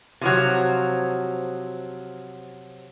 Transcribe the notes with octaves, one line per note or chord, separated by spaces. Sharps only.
C3 F3 F#3